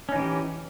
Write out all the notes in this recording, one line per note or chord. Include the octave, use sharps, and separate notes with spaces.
E3 C#4 D#4 G4